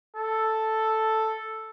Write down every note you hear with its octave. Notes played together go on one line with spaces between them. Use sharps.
A4